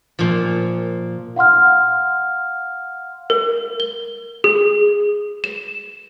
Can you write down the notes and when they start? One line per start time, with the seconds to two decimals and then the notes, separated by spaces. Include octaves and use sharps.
0.19 A#2 F3
1.36 F5 F#5 C6 F6
3.30 A#4
3.80 G7
4.44 G#4
5.44 E7